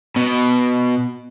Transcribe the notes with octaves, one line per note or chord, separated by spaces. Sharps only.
B2